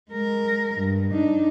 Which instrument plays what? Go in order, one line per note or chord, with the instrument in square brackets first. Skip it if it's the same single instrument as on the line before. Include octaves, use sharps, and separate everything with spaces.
[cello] G#3 A#4
G2
D4 D#4